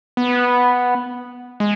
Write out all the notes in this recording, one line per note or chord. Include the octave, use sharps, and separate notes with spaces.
B3
G#3